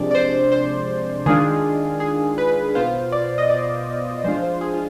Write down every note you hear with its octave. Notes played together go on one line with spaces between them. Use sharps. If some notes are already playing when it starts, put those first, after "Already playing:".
Already playing: C3 F3 G#3 D4 D5
D5
C5
C5
D#3 G#3 D4 F4 G#4
G#4
B4
B2 B3 F4 C5
D5
D#5
D5
F3 G#3 D4 F4 C5
C5
G#4
F4